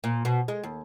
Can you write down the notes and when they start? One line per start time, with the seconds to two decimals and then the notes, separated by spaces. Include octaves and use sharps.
0.04 A#2
0.25 B2
0.48 G#3
0.63 D#2